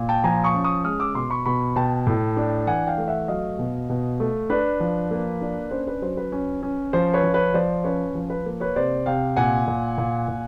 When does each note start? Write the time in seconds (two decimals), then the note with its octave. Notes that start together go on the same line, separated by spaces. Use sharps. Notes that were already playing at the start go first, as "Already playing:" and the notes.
Already playing: A#2
0.09 G5 A5
0.24 F3 G#5 A#5
0.44 C#6 D#6
0.54 C#4
0.64 C#6 D#6
0.84 G#3 D#6 F6
1.00 D6 E6
1.15 B2 C6 D6
1.30 B5 C#6
1.46 B2 B5 C#6
1.76 B2 G5 A5
2.07 A2
2.37 D4
2.67 E3 F#5 G#5
2.87 F5 G5
2.98 A3
3.08 E5 F#5
3.28 F#3 D#5 F5
3.59 B2
3.89 B2
4.20 A3
4.50 D4 B4
4.80 F3
5.11 A#3
5.41 D4
5.71 C#4 C5
5.87 B4
6.02 F#3 C5
6.17 B4
6.32 C#4
6.63 C#4
6.93 F3 C5
7.14 B4 C#5
7.24 F3
7.34 B4 C#5
7.54 F3 C5 D5
7.84 C#4 B4 C#5
8.15 F3
8.30 B4
8.46 A#3
8.60 B4 C#5
8.76 C3 C5 D5
9.06 C3 F5 G5
9.36 A#2 F#5 G#5
9.67 A#2
9.98 A#2
10.28 A#2